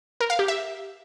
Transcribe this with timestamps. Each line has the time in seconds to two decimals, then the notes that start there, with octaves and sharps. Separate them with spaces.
0.20 A#4
0.30 F5
0.39 G4
0.48 E5